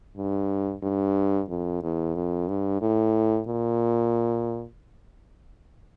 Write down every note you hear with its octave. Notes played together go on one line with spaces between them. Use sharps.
G2
G2
F2
E2
F2
G2
A2
A#2